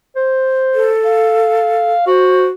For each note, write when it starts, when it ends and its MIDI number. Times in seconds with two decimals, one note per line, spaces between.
0.16 0.91 72
0.74 1.93 69
1.05 2.05 77
2.07 2.50 66
2.07 2.46 72